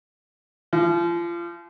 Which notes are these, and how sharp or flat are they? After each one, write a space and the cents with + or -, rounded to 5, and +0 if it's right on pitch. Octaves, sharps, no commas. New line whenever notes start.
F3 -30